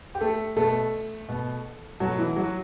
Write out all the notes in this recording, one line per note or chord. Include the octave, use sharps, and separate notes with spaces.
G4
A3 A4
B2 A3 A4
B2 A3
B2 F#3 A3 F#4
E3 E4
F#3 F#4